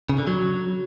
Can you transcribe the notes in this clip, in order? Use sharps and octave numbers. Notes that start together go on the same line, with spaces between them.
C#3
D3
F#3